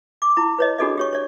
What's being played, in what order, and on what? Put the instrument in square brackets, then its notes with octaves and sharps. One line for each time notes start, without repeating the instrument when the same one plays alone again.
[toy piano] D6
E4 A#5
B4 C#5 D#5
D4 F#4 G#4 A4 D5 D#5
G4 C#5 C#6
C#5 D5